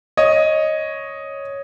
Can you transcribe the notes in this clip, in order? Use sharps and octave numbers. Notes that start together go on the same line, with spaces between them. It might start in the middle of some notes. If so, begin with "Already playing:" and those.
C#5 D#5